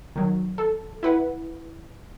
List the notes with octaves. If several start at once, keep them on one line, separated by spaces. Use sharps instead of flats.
D#3 F#3
A4
E4 B4 F#5